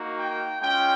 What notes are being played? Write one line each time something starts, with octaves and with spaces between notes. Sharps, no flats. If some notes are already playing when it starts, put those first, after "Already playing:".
Already playing: A#3 D#4 F#4
G5
G#3 C#4 F4 G5